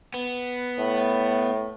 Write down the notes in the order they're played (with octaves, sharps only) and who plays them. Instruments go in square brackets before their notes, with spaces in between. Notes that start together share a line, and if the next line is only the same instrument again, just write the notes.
[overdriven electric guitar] B3
[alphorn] A2